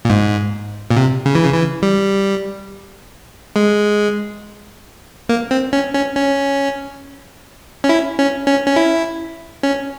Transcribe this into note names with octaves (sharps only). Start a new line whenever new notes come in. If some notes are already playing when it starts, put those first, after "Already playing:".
A#2
G#2
A#2
C3
C#3
E3
C#3
E3
G3
G#3
A#3
C4
C#4
C#4
C#4
C#4
E4
C#4
C#4
C#4
E4
C#4